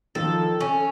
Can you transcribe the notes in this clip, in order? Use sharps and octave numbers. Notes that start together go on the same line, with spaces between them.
D#3 F3 A4
C#4